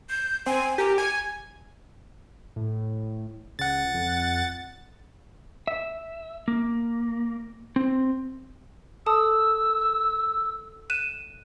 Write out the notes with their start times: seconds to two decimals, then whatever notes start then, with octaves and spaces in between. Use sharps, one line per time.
0.10 G6
0.46 C4 G#5
0.78 G4 A#4
0.98 G#5 G#6
2.56 A2
3.59 C#2 F#5 A6
3.94 F2
5.67 E5
6.48 A#3
7.76 C4
9.06 A4 A5 D#6 E6
10.90 F#6 D#7 E7